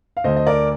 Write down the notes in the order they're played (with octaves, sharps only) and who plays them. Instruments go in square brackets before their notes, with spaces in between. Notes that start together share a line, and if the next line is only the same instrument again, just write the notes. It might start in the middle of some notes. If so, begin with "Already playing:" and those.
[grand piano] F5
D2 D3 A3 C5 D#5
D#5
A#4 D5